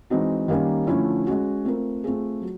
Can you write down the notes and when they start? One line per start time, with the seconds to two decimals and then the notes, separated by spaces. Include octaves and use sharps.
0.10 E3 G#3 C4 D#4 F#4
0.48 D#3 G3 A#3 C#4
0.87 D3 F3 A3 C#4 E4
1.26 G#3 C#4 F#4
1.65 A3 C4 F4 A#4
2.04 A3 C4 F4 G#4
2.42 F#3